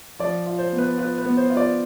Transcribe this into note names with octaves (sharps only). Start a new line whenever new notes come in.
F3 D5
F4
C5
B3
B4
F4 B4
B4
B3
C5
F4
D5